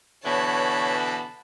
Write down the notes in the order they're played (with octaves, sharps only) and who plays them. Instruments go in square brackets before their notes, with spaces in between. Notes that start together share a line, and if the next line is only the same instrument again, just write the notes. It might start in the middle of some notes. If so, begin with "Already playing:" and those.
[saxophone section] B2 D3 E3 [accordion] C#5 [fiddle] A5 B5